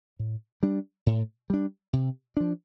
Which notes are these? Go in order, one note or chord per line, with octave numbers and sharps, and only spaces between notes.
A2
G3 D4
A2
G3 D4
C3
F3 D4